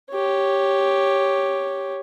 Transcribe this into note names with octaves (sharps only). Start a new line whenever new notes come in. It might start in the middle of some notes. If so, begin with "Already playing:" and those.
G4 C#5